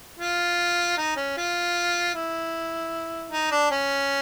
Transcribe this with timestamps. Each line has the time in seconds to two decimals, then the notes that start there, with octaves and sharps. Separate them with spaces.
0.19 F4
0.97 D#4
1.16 C#4
1.37 F4
2.14 E4
3.32 D#4
3.51 D4
3.71 C#4